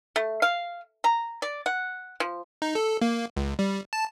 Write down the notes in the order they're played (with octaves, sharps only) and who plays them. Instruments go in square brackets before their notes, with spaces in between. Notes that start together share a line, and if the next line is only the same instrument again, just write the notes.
[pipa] A3
F5
A#5
D5
F#5
F3
[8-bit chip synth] D#4
A4
A#3
C#2
G3
A5